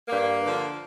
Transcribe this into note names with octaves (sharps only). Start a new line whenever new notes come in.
G2 A#3
D3 F3